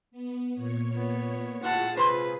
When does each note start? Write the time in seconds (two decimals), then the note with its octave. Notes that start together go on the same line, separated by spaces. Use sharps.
0.11 B3
0.55 A#2 C#5
0.96 B3
1.63 A2 F4 F#4 G#4 F#5 A5
1.97 C3 G#3 B4 C5